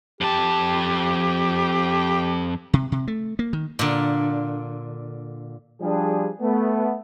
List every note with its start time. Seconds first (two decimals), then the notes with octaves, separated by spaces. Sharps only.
0.21 F2 G4 A5
2.73 C3
2.92 C3
3.08 A3
3.39 A#3
3.53 D#3
3.79 A#2 D3
5.81 F3 G3 D4 G#4
6.41 A3 B3